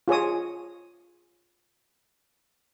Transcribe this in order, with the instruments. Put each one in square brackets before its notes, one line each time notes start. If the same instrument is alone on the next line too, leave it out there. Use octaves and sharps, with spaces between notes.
[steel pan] F4 G#4 C#5 D#6